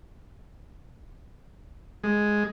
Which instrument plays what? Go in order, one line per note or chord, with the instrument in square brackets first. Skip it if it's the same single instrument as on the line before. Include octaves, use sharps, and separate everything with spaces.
[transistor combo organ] G#3